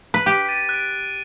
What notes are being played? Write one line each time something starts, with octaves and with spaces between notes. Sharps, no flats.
B4
G4
A6 D#7
F#6 D7